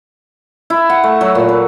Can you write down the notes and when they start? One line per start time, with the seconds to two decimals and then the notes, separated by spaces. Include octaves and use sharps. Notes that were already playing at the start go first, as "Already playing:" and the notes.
0.70 E4
0.90 F#5
1.04 A3
1.21 F#3
1.35 A#2
1.49 B4